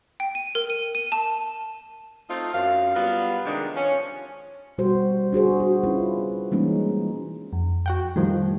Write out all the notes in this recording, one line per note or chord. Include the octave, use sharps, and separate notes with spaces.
G5
D#7
A#4
D#7
D#7
A5
A3 C4 D#4 F4
F#2 F5
F#3 G3 B3 F4
C3 D#3 G#3 D4
F3 C#4
B2 G3 F#4 G4 C5
D4 F#4 G#4 C5
F#4
C#4 E4 F4 B4
E3 G3 G#3 A#3 C#4 D#4
F2
F#4 F#5 G5
A2 D#3 F3 G3